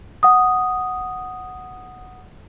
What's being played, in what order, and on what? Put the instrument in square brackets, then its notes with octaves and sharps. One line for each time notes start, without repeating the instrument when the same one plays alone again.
[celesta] F#5 D#6